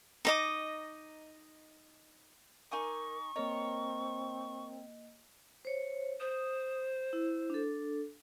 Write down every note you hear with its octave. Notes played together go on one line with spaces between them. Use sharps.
D#4 D#5 D6
D#4 A#4 G#5 C#6 D6
A#3 C4 A#4 C#5 D#5
C5 C#5
C5 D#6
E4
D4 A4